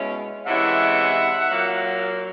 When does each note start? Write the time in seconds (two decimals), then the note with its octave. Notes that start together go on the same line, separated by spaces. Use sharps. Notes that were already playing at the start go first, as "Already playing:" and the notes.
Already playing: B2 G#3 C#4 E4
0.46 C3 E3 G#3 C#4 E4 E5 F#5
1.49 A#2 F#3 A#3